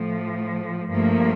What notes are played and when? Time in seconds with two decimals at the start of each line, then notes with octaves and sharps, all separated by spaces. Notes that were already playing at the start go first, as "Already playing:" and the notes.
Already playing: A2 F3 A3
0.90 G2 F3 A3 A#3